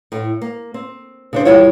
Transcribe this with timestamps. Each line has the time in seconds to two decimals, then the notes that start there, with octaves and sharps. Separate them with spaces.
0.12 A2 A3
0.41 A#3
0.74 C4
1.33 C#3 D4 C5
1.45 D#2 E3 G3 E4 F4 C#5